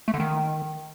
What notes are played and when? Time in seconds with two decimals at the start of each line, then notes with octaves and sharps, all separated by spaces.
0.08 A3
0.14 D3
0.20 D#3